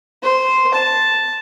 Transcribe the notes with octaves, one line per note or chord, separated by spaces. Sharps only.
C5
A5